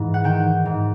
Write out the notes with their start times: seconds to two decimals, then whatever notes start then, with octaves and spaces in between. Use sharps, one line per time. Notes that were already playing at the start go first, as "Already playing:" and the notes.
Already playing: G#2 E3
0.14 F#5
0.24 D#3 G5
0.66 G#2